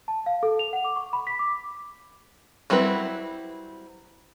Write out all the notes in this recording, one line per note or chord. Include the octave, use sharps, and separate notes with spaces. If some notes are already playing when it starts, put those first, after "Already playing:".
A5
F5
A4
F7
F#5
D6
C#6
B5
B6
D6
F#3 G3 C4 E4 B4